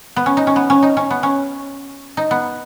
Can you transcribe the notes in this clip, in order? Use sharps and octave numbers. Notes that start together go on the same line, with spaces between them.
B3
C#4
D#4
C#4
B3
C#4
D#4
C#4
B3
C#4
D#4
B3